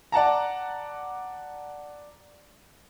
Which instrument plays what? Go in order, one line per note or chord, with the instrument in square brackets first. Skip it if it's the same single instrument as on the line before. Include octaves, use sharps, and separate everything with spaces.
[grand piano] D5 F#5 A5 A#5